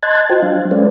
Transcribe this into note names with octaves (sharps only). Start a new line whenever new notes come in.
D#5 A5 C6 F#6 G#6 A6
F4 F#4 C5 D#5 G5
F#3 D4 F5
G#3 C#4 A4 B4 C5 D5